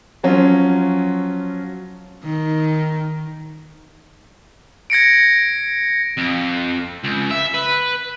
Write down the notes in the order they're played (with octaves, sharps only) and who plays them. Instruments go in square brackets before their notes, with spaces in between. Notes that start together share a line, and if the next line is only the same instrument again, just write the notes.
[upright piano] F3 F#3 C#4 F4
[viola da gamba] D#3
[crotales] G#6 A#6 C#7 D7
[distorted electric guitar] F2
C#2
E5
B4